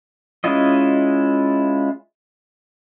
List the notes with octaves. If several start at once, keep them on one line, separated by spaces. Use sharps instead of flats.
G#3 C#4 E4 F4 D#5